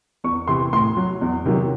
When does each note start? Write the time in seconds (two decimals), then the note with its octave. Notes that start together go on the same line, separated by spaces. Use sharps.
0.24 E2 C#6
0.48 C3 E3 C6
0.73 A2 C6
0.97 F#3
1.21 E2
1.45 C3 D#3 F#3